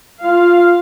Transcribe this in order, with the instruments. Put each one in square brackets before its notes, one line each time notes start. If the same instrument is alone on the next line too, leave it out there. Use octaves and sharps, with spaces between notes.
[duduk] F4 [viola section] F5